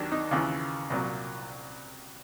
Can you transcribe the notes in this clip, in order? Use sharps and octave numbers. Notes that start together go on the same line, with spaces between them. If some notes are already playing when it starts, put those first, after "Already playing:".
Already playing: D#2 D#3 F#3 D4 G4
D#4
D#2 C#3 E3 F4
C2 A#2 F#3